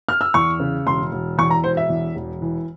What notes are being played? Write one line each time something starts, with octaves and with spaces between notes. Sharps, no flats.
F6
E6
E2 C#6
C#3
E1 C6
E1
E2 C#6
A#5
E1 C5
E5
E2
E1
E3